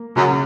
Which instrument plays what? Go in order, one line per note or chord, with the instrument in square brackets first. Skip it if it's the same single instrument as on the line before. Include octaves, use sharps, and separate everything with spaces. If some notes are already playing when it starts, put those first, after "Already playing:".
Already playing: [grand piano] A#3
[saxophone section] F#2 [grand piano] C#3